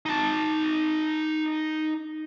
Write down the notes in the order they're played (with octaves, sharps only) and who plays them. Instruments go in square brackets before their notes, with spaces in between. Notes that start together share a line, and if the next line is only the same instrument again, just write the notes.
[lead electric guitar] D#4 A5